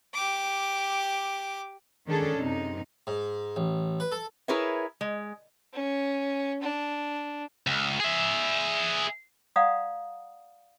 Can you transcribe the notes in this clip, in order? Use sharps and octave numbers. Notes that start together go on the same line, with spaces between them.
G4 D6
D#3 G#3 C#4 D4 G#4 A4
F#2 C3 D#4
G#2
A1
B4
A4
E4 G#4 A#4 B4 C#5 E5
G#3
C#4
D4
C#2
G#4 E5
D5 F5 F#5 A#5 D#6